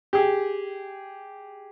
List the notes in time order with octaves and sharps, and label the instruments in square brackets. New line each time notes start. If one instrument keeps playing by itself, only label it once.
[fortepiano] G4 G#4